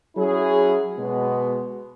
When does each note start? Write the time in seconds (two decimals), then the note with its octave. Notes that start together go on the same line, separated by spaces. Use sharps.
0.16 F#3 C#4 E4 G#4
0.97 B2 G#3 B3